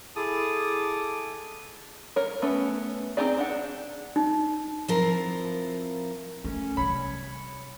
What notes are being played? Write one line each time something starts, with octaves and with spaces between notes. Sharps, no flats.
E4 G#4 A4 A5 D6 D#6
A#4 C#5
A3 B3 C#4
C4 D#4 G4 G#4 D5
D4 F#5
D#4
F3 C4 E4 F4 A#4
A3 C#4
C3 G3 C#5 B5